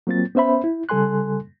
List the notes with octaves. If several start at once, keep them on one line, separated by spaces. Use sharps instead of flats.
F#3 A#3 C4 F4 A6
B3 C#4 C5 E5 B5
E4
C#3 G3 A4 G#5 C6 F#6